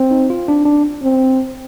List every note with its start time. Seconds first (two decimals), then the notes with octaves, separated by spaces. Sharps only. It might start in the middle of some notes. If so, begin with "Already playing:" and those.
Already playing: C4
0.11 D#4
0.30 F4
0.48 D4
0.65 D4
1.03 C4